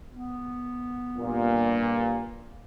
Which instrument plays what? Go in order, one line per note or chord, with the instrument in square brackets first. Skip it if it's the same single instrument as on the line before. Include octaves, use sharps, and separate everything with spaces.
[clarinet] B3
[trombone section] G2 A#2